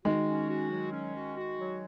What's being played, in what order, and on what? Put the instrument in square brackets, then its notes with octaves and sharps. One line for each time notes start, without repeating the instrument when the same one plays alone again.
[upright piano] D#3 G#3 [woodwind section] F#4
[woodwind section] C#4
F#4
F#3
C#4
F#4
F#4
F#3